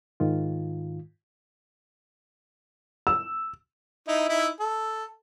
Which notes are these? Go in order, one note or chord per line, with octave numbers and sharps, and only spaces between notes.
G#2 D#3 F4
E6
D#4 E4
D#4 E4 E5
A4